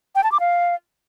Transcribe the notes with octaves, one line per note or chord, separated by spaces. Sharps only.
G5
A5
D6
F5